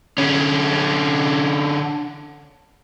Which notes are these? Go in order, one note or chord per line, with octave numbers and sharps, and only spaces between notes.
D3 C#4